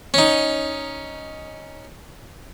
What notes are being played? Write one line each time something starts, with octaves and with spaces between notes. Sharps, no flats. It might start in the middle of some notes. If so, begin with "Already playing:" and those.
C#4 D#4